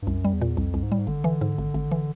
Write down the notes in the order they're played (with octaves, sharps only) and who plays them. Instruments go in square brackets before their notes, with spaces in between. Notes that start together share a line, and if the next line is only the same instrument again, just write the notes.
[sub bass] G2
[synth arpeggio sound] C2 [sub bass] F#2
[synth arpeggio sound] G3
[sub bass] E2
[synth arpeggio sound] A#2
[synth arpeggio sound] C2 [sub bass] F2
[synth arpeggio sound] C2
[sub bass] G#2
[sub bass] A2 [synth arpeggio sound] G3
[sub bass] G#2
[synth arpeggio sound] G#1 [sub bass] D3
[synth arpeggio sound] E3
G#2
G#1
G#1
E3